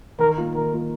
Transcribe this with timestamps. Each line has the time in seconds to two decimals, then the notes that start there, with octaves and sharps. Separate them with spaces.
0.19 D#3 A#4
0.38 A#3 F4
0.55 D#3 A#4
0.72 A#3 F4